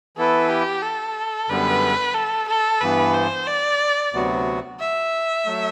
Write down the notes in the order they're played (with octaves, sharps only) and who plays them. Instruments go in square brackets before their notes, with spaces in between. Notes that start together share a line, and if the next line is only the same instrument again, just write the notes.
[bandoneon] E3 B3 E4 B4 [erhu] A4
[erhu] G4
A4
[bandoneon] F#2 D3 G3 B3 [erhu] B4
[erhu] A4
A4
[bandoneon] G2 E3 B3 [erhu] B4
[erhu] C5
D5
[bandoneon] D2 C3 F#3 B3 F#4
[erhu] E5
[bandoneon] F#3 A3